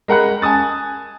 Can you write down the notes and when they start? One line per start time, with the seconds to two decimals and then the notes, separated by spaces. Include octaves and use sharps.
0.08 G#3 A#4 F#5 B5 F#6
0.42 G#5 A5 D#6 A6